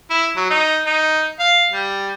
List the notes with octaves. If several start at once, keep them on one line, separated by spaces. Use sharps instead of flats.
E4
F#3
D#4
D#4
F5
G3